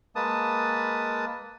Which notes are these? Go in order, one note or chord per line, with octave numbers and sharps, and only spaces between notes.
G#3 A#3 B4 A5 D#6